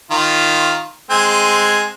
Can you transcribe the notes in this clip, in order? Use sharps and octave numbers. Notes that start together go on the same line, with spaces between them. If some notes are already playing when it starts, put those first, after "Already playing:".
D#3 F4
G#3 C4 G#5